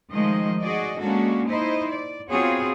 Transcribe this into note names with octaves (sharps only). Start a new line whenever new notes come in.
D#3 F3 G#3 A3 C5 D#5
F#4 G#4 D5 D#5
G#3 A#3 C#4 D4 F#4 A4
D#4 E4 C5 D#5
D5
B3 C4 F4 F#4 G#4 C#5